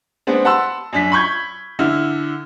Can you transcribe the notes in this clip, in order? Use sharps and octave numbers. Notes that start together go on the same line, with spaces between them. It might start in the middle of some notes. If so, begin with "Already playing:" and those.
G#3 B3 C4 D4
F#5 A5 B5 C6 E6
F#2 D4 B6
B5 C#6 G6 G#6
D3 E4 F6